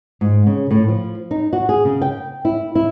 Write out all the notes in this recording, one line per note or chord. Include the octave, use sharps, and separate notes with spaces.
G#2
C#3
A2
F3
D#4
F#4
G#4
C#3
G5
E4
E4